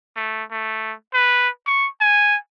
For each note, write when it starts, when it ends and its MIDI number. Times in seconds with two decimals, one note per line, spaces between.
0.16 0.43 57
0.51 0.94 57
1.14 1.48 71
1.67 1.88 85
2.01 2.37 80